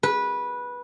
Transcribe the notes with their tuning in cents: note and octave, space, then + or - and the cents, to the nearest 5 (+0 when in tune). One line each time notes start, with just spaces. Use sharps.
B4 -15